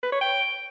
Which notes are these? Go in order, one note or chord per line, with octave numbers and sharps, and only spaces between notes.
B4
C#5
G5